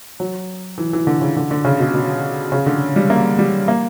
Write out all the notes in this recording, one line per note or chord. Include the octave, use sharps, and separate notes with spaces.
F#3
E3
E3
D3
C#3
D3
D3
C#3
B2
B2
C#3
D3
G3
A#3
G3
A#3